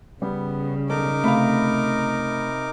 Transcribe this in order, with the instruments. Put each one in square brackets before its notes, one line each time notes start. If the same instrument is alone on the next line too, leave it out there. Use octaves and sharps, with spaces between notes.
[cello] C#3 [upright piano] G3 [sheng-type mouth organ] B3
[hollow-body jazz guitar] B1 A4 [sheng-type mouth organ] D#4 A#4 D6
[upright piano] C3 B5 [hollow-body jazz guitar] A3 F5